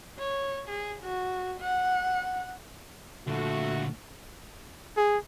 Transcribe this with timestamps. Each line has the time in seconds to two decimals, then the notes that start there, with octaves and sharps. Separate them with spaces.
0.18 C#5
0.68 G#4
1.02 F#4
1.61 F#5
3.28 A#2 D3 A3 F#4
4.97 G#4